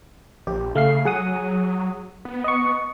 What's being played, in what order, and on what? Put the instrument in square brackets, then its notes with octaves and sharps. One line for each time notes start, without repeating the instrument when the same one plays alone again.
[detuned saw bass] A#1 [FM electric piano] G4
[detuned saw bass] C#3 [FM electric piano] A3 F5 C7
[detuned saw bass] F#3 [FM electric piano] G#4 F#5 D#6
[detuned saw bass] B3
[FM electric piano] D#5 C#6